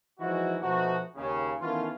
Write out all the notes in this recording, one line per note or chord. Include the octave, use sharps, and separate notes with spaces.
E3 F3 G#3 D#4 E4 F#4
B2 F3 A3 B3 D#4 F#4
D#2 C#3
D#3 E3 A3 B3 C#4 F4